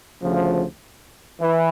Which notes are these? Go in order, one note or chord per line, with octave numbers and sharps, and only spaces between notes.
D2 C#3 F3
E3